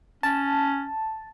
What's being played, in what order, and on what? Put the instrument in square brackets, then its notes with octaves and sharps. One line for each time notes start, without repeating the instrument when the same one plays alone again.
[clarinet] C#4 [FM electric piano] A5